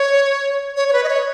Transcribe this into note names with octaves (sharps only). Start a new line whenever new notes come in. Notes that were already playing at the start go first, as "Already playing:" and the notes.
Already playing: C#5
C#5
C#5
B4
D#5
C#5